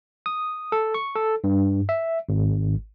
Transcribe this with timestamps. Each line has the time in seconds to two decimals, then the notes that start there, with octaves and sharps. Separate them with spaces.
0.26 D#6
0.72 A4
0.94 C#6
1.16 A4
1.44 G2
1.89 E5
2.29 G#1